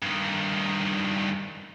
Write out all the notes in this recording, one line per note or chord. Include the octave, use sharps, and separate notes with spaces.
G2 D#3